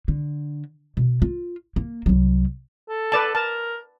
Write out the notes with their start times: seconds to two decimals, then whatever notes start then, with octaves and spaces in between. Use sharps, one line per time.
0.08 D3
0.97 B2
1.22 F4
1.76 A#3
2.06 C2 F#3
2.89 A4
3.12 B4 D5 A5
3.35 A#4 A5